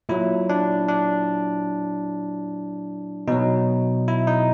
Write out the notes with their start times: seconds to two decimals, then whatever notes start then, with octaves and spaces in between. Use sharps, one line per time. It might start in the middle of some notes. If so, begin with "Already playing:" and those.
0.09 A#2 F#3 E4
0.50 D4
0.88 D4
3.28 B2 F#3 D#4
4.08 E4
4.27 D#4